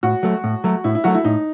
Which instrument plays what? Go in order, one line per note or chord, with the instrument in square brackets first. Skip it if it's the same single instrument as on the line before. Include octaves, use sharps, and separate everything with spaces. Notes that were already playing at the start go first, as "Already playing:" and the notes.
[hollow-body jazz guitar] A2 [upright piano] F#4
[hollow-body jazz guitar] F#3 A3
A2
F#3 A3
[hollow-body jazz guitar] A2 [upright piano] E4
[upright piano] E4
[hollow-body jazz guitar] F#3 A3 [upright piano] F#4
[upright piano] E4
[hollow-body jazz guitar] A2 [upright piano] D#4